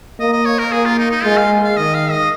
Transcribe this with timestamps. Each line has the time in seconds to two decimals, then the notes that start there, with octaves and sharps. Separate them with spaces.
0.20 A#3 D#5
0.32 D#5
0.45 C#5
0.59 A#4
0.72 A#3 G#4
0.85 F4
0.98 D#4
1.11 D#4
1.24 G#3 F4
1.37 F5
1.63 F5
1.77 D#3 D#5
1.94 F5
2.11 D#5